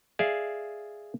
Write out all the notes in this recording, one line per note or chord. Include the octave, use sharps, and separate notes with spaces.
G#4 D5 E5 F5